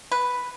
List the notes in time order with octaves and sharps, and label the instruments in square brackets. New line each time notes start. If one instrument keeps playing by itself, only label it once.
[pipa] B4